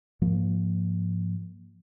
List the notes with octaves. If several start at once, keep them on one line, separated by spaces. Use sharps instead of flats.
G#2 F3 A#3